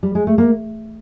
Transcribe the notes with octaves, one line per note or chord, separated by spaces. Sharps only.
G3
G#3
A3
A#3